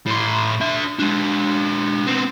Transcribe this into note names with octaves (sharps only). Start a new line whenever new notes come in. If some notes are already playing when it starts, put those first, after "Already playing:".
A2 C6
D4 E5
G#3 D4
B3 C4